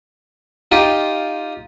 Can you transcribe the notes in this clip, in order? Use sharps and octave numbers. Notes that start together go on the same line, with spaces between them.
D#4 F4 G4